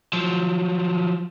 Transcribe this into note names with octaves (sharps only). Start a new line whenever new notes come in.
F3 F#3